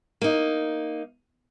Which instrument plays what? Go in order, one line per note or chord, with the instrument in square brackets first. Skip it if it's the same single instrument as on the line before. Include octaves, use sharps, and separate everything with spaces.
[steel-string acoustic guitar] A#3 D#4